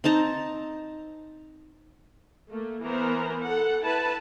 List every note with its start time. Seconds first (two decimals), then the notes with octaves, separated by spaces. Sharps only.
0.04 C4 D#4 A5 A#5
2.49 A3 A#3
2.83 E3 B3 A#4 C5 A#5
3.42 A4 F#5
3.84 E4 B4 A5